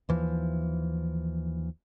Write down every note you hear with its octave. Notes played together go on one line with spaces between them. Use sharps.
D#2 E3 F3